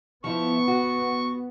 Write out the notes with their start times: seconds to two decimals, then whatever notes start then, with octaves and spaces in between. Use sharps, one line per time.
0.24 F3 B3 E4 C#6
0.68 F#4